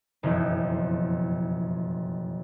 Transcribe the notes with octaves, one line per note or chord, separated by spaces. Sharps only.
F#1 B1 F2 E3